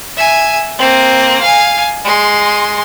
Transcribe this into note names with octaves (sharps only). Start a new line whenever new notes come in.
E5 G#5
A#3 C4
F5 G#5
G#3 C6